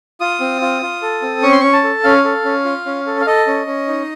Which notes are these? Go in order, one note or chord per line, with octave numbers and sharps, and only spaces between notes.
F4 D#6
C4
F4
F4
A4
C4
C#4 C#6
C6
C#4 C#6
A5
A4
C#4 F5
A4
C#4
F4
C#4
A4
F5
A4 D#5
C#4
C#4
D#4